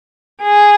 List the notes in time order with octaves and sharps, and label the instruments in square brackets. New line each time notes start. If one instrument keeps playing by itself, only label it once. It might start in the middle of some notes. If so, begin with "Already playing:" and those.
[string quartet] G#4